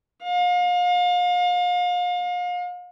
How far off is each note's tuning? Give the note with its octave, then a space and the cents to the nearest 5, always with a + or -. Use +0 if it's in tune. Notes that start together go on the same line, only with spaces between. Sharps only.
F5 +35